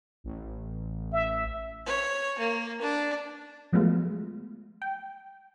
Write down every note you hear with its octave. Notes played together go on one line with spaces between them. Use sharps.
A1
E5
C#5
A#3
D4
F3 F#3 G#3 A3 B3 F4
G5